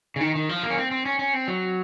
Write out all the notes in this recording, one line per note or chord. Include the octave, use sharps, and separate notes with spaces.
C#3
D#3
D#3
F3
A#3
C#4
C4
C4
C#4
C#4
C4
F#3